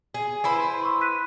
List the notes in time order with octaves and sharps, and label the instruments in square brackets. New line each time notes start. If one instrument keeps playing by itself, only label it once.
[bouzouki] G#4
E4 B4 C5
[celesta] C6 C#6 E6
F#6 B6 D#7